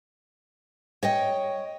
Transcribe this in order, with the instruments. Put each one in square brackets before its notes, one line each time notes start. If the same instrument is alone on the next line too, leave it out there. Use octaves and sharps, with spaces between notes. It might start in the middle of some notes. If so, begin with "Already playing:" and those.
[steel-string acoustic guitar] C#5 D#5 G5